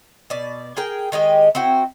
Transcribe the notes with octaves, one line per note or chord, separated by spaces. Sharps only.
B2 D5
G#4 A#4 G5
D#3 G#3 G4 D#5
C4 E4 F#4 G5